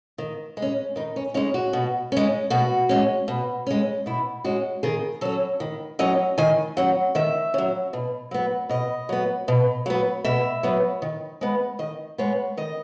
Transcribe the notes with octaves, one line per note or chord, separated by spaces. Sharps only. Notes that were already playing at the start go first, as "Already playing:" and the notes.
D#3
G#3
C#4
D#3 D#4
C#4
G#3 C#4 D#4
F#4
B2
G#3 C#4
B2 F#4
G#3 C#4
B2
G#3 C#4
B2 E4
G#3 C#4 F#4
D#3 G#4
F#3 C#4 A4
D#3
F#3 C#4 D#5
D#3 G#5
F#3 C#4 F#5
D#3 E5
F#3 C#4
B2
F#3 B3
B2 D#5
F#3 B3
B2
F#3 B3
B2 E5
F#3 B3
D#3
G#3 B3
D#3 D#5
G#3 B3 C#5
D#3 D#5